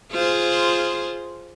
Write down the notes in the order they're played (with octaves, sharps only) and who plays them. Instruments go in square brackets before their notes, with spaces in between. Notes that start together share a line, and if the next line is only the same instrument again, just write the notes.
[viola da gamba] F4 G#4 C5